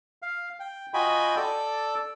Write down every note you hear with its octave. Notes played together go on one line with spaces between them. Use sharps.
F5
G5
F4 F#4 D#5 G5 G#5 B5
A4 D5 E6